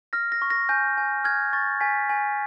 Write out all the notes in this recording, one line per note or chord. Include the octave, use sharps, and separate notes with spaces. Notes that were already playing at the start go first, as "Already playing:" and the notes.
F6 A#6
A#6
C#6
A#6
G#5 G6
G#5
F6 G#6
C#6 A6
G#5 B6
G#5